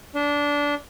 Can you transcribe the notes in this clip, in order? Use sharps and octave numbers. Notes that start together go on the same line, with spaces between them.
D4